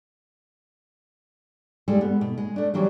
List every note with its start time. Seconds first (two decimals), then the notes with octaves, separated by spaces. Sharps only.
1.88 G3 G#3 A4
2.01 B3
2.21 B2
2.38 G#3
2.56 A3 D4
2.74 E3 F#3 G3 D4